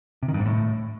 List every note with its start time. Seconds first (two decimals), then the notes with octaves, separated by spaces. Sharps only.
0.23 C3
0.28 D#3
0.34 G2
0.40 G#2
0.46 A2